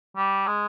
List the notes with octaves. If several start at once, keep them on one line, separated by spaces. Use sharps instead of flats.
G3
G#3